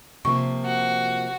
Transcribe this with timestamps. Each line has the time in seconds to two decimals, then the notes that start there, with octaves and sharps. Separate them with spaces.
0.25 C3 F3 A#3 C#6
0.65 F#4